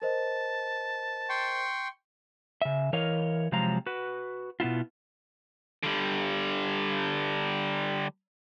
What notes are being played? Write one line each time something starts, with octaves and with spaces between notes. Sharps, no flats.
A#4 C5 D#5 A5
G5 C6 C#6
C#3 E5
E3 A#4 C#5 D#5 F5
C3 F3 F#3 G#3 F5 A#5
F#4 B4
B2 B3 E4 F4
D3 G3